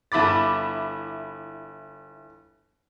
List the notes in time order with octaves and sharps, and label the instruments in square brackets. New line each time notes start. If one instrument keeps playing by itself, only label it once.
[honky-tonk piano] G1 E4 B5 D6 A6